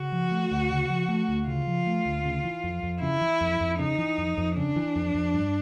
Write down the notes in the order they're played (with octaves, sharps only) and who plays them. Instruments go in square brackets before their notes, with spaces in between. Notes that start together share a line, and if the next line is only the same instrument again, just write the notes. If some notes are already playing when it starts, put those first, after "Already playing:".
Already playing: [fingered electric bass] C#3 [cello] F#4
[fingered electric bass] F3
A3
D2
C#3
F3
A3
D2
[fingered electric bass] C#3 [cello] F4
[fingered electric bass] F3
A3
D2
C#3
E3
F2
F2
[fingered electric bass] C#3 [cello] E4
[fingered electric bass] E3
F2
F2
[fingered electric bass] C#3 [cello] D#4
[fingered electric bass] E3
F2
F2
[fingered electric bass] C#3 [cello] D4
[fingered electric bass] E3
F2
F2
G2